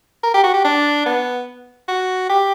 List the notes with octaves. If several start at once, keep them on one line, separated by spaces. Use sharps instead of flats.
A#4
G4
F#4
G4
D4
B3
F#4
G4